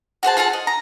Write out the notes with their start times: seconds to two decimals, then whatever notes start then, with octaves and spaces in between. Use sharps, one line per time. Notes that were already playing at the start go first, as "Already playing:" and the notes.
0.23 F#4 G#4 C5 A5
0.37 F4 G#4 A4 A5
0.53 D#5
0.67 A#5